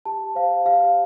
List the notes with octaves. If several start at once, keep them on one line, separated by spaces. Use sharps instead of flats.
G4 A5
C5 F5
G4 F5